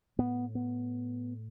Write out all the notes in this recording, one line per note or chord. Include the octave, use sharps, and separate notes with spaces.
A2 B3
B3